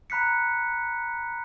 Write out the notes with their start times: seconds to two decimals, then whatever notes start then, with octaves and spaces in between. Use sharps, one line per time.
0.10 A#5 B5 F#6 B6 C#7